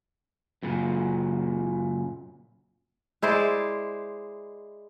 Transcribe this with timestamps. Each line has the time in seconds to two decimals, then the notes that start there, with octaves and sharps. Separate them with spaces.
0.63 F#2 A#2 C#3
3.22 G#3 E4 C5 D5